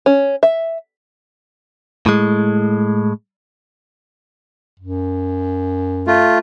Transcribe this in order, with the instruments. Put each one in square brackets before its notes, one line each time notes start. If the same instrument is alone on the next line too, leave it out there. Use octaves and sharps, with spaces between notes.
[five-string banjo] C#4
E5
[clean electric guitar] A2 G#3
[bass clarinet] F#2
[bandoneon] A3 F4